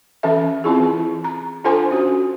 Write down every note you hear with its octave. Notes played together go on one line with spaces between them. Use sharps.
E3 C#4 A4 E5
C4 E4 F4 G#4
E3
A#5
D4 F4 A4 C5 G#5 C6
C#4 F#4